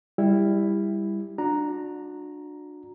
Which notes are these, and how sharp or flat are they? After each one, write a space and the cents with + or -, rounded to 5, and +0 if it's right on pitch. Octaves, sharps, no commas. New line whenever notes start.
G3 +20 E4 +0
D4 +15 F#4 -35 A#5 +0